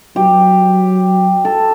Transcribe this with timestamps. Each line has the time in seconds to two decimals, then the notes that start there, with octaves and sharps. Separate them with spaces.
0.16 F#3 G4
1.45 A4